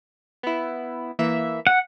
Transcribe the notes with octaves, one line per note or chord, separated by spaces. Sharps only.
B3 E4
E3 A#3 E5
F#5